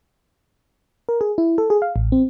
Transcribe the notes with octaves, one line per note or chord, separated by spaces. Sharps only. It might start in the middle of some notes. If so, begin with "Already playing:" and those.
A#4
G#4
E4
A4
G#4
F5
A1
C4